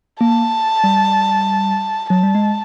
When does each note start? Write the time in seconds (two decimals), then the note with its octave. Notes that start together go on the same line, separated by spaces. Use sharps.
0.21 A#3 A5
0.84 G3
2.10 F#3 A5
2.23 G3
2.35 G#3